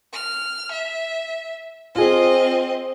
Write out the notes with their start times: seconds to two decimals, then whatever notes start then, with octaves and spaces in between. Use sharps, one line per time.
0.13 F6
0.72 E5
1.95 C4 F4 G#4 D#5